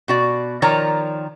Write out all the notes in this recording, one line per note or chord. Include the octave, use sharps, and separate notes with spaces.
B2 F#4 D5
D#3 F3 A#4 C#5 D5 A#5